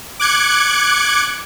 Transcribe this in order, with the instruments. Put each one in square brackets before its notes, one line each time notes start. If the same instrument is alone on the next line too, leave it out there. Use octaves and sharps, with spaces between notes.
[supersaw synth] D6 F#6 G#6 C#7